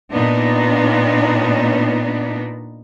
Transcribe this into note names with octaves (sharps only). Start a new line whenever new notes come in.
A#2 B3 D4 D#4